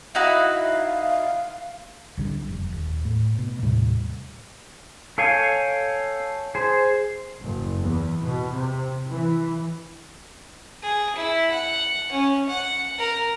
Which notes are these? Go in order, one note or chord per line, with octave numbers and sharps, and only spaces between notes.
D#4 E4 F#4 F5
B1 D3 G3
F1
D#1
A2
B2
D#2 A2 C3 G3
A4 C#5 F5 G5 G#5
G#4 C5
F#1
E2
B2
C3
E3
G#4
E4
F#5
C#4
F#5
A#4